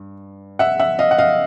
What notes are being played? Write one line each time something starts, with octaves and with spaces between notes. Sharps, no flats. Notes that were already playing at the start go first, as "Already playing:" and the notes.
Already playing: G2
E5 F#5
E5 F#5
D#5 F5
F#5
D#5 F5